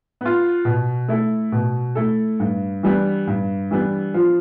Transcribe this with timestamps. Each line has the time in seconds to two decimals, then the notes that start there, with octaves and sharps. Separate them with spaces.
0.21 B3 F4
0.65 B2
1.08 A3 E4 A4
1.52 B2
1.95 A3 E4 A4
2.40 G2
2.83 E3 G3 B3 D4
3.27 G2
3.71 E3 G3 B3 D4
4.14 F3